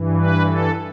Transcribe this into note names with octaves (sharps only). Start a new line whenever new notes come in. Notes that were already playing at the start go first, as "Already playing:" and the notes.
Already playing: G2 E3
B4
A4